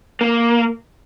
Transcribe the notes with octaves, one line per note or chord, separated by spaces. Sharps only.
A#3